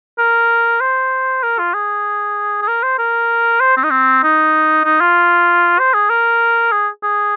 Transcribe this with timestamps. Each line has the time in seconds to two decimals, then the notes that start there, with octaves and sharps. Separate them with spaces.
0.18 A#4
0.81 C5
1.43 A#4
1.59 F4
1.74 G#4
2.62 G#4
2.68 A#4
2.83 C5
2.99 A#4
3.61 C5
3.77 C4
3.84 D#4
3.91 C4
4.24 D#4
4.85 D#4
5.01 F4
5.79 C5
5.94 G#4
6.10 A#4
6.72 G#4
7.03 G#4